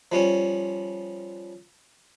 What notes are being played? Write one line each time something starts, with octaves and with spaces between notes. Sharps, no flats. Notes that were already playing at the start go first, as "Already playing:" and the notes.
F3 G3 C#4